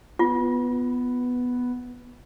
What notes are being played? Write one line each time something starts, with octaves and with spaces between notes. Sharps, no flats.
B3 F4